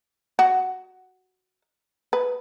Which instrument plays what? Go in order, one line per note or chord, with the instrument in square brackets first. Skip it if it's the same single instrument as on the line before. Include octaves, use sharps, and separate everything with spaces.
[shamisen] F#4
B4